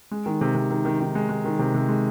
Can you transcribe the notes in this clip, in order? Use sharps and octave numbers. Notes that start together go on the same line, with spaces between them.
G#3
D#3
C3
C3
D#3
D#3
D#3
G#3
G#3
D#3
C3
C3
G#3